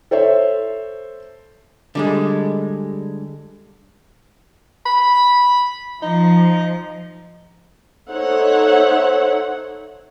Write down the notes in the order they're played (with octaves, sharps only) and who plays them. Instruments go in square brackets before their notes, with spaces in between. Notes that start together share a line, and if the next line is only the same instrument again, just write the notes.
[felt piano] A4 C5 C#5 E5
[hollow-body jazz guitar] D3 G3 G#3
[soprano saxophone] B5
[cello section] F3 [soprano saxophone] D#4
[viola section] D#4 A4 C5 C#5 E5 F#5